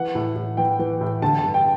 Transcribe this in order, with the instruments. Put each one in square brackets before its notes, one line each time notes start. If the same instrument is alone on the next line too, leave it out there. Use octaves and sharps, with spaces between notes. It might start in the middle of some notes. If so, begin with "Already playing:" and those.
Already playing: [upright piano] E3 F#5
A2
A2
E3 G5
E3
A2
D3 A5
A5
G2
G5